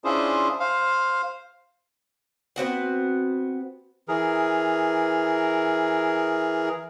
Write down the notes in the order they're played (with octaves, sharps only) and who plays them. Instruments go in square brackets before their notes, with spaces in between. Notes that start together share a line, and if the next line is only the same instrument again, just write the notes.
[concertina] C#4 D4 E4 F4 G#4 C5
C5 F5
[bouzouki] B3 C4 F#4 F#5
[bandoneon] E3 G#4 A#4